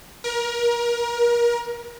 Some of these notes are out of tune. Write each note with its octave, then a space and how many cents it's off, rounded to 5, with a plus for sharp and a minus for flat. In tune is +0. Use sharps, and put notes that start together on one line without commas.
A#4 +30